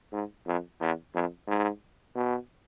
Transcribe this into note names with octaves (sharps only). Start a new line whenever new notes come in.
G#2
F2
E2
F2
G#2
B2